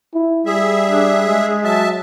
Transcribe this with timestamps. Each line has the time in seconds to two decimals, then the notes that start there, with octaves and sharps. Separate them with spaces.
0.14 E4
0.46 G3 G#4 E5
0.88 D4
1.26 G#3
1.64 F#3 E5 A5